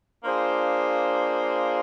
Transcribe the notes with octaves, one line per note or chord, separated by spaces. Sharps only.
A#3 D4 F4 G#4 C5